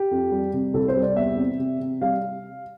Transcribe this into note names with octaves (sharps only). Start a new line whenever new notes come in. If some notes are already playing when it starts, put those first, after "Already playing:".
Already playing: G4
F2
G3
C3
C2 A4
C5
G3
D5
E2 E5
C3
C3
C3
G3 F5